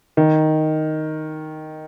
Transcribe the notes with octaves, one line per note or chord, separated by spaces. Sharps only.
D#3